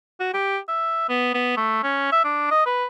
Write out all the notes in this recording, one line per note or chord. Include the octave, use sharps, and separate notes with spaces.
F#4
G4
E5
B3
B3
A3
C#4
E5
D4
D#5
B4